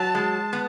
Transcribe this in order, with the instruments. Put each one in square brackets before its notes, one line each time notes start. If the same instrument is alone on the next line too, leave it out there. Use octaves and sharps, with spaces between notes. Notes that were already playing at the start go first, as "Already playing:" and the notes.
Already playing: [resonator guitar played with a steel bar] F#3 [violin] A5
[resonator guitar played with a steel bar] G#3
B3